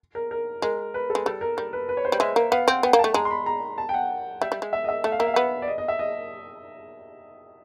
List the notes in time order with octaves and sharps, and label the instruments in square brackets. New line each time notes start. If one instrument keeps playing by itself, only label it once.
[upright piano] A#4
A#4
[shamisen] G#3 [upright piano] A#4
[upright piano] B4
A4
[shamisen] G#3
[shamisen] G3 [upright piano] A4
[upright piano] A#4
[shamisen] G3 [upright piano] A#4
[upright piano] B4
B4
C#5
C5
[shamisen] G3
[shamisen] G#3 [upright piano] E5
[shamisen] A#3
[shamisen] B3 [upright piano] F5
[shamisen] C4 [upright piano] F#5
[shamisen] B3 [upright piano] G5
[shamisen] A#3
[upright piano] A5
[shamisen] A3
[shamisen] G#3 [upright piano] A#5
[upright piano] C6
B5
A#5
A5
G5
F#5
[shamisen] G3 [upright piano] E5
[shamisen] G3
G#3
[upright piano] E5
D#5
E5
[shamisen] A3 [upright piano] E5
[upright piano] F5
[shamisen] A#3 [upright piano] E5
[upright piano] F5
[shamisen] B3 [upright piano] E5
[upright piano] D5
D#5
D#5
E5
D#5